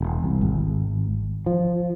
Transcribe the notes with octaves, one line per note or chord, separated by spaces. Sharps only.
E1
C2
G#1
F3